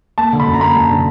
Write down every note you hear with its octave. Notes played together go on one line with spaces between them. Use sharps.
A#3 A5
D3
B5
F#2
A#5
A#3 B5
F#2
D3